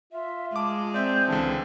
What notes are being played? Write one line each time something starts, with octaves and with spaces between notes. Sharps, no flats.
F4 E5
G#3 A5 D6
C4 D5 E5 G6
C#2 D3 E3 A5